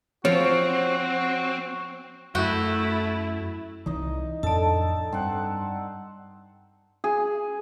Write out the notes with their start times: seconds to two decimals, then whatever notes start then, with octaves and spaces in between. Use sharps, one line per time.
0.25 F3 C4 F#4 C#5
2.35 F#2 A3 E4 F#4 G5
3.86 C2 E3 D#4 D#5
4.43 F2 A2 D4 A4 D5 A5
5.13 G2 C4 F#5
7.04 G#4